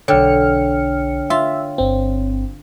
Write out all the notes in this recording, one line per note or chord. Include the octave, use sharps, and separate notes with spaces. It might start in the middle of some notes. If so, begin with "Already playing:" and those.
B1 D3 C#5 G5 F6 C#7
F4 E5
G1 C4